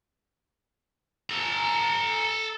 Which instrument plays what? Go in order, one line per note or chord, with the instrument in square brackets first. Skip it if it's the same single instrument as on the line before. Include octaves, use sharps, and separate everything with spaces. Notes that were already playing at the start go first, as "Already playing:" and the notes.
[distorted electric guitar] A4 A#5